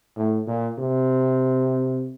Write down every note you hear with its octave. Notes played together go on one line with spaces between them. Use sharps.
A2
A#2
C3